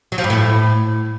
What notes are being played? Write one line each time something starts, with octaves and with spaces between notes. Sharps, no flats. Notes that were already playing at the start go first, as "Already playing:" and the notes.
F#3
F3
G2
A2